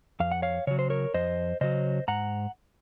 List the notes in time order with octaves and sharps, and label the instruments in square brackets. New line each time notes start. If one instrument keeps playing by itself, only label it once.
[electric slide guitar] F2 F5
F#5
C#5 F5
C#3 F#3 C#5
C5
A#4 C#5
F2 C5 D#5
C#3 F#3 C5 D#5
G#2 F#5 A#5